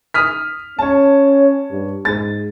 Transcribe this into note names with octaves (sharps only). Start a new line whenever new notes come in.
D#6 F6 B6
C#4 C#5 A5
G2
G#2 A6